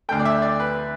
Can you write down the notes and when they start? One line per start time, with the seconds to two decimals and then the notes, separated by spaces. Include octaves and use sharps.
0.09 D2 D3 A3 G5
0.20 D5
0.25 E5
0.42 D5
0.60 B4